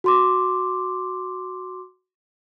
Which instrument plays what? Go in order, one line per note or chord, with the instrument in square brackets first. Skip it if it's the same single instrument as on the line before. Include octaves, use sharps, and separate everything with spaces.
[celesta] F#4 C6 D6